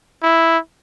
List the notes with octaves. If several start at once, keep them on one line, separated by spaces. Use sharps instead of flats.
E4